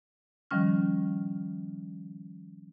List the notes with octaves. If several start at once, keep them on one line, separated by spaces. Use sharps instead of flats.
D#3 F3 G3 C#4 F6